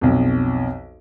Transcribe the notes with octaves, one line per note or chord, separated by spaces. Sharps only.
B1 F2